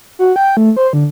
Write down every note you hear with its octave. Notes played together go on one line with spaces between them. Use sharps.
F#4
G5
A3
C5
D3